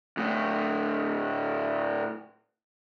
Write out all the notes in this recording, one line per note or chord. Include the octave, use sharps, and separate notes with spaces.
D2 A2